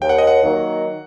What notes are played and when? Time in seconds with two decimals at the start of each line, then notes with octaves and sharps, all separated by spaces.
0.01 D#2 G5
0.09 F#5
0.18 D#5
0.27 F#5
0.43 D#3 F#3 A#3